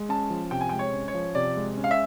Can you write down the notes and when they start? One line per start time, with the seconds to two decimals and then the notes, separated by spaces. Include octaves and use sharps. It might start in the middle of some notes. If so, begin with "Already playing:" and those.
Already playing: G#3
0.09 C#4 A5
0.30 F3
0.51 C3 G5
0.61 G#5
0.69 G#3 G5
0.79 C#5
0.93 C#4
1.08 C#5
1.14 F3
1.35 C3 D5
1.57 G#3
1.77 C#4
1.84 F5
1.91 E5